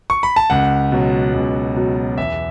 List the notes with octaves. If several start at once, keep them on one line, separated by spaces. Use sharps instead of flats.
C#6
B5
A5
C#2 F#5
B2 F#3
C#2
B2 F#3
E2 E5